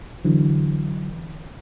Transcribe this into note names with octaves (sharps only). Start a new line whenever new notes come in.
D3 E3 F#3